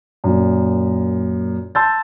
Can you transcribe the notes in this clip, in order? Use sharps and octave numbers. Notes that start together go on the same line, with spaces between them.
F#2 A#2
A5 C6 E6 G6 A6